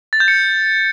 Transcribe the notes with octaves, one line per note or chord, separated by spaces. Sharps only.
A6
G6
C#7